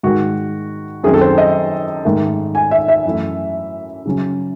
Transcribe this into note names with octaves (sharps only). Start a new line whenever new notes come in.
G#2 D#3 G#3 F#4
F#2 D#3 F#3 C4 G#4
A4
C5
D#5
G#2 D#3 A3
G#5
E5
E5
F#2 E3 A3
C#3 F#3 C#4